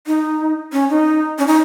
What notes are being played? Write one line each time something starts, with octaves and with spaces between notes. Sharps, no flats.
D#4
C#4
D#4
C#4
D#4